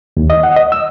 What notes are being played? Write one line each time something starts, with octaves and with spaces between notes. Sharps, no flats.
D#2
D#5
F#5
D#5
E6